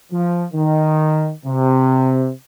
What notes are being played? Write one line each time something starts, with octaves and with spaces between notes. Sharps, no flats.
F3
D#3
C3